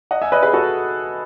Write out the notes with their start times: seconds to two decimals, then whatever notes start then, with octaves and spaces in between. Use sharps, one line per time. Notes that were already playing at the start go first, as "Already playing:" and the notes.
0.11 D#5 F#5
0.22 E5 G#5
0.32 B4 D#5
0.43 G#4 B4
0.53 F#4 A4